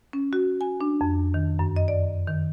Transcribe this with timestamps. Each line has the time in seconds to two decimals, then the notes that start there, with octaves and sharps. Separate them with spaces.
0.13 C#4
0.33 F#4
0.61 G#5
0.81 D4
1.01 F2
1.34 D#3
1.59 F#2
1.76 D#5
1.88 D5
2.27 D#3